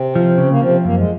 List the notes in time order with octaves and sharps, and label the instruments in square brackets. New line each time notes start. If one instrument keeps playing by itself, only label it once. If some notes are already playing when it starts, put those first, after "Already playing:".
Already playing: [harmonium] C3 C4
[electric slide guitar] F3
C#3
[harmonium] A#3
[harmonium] C3 C4 [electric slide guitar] F3
[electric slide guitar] F#2 [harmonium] A#3
[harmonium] G#3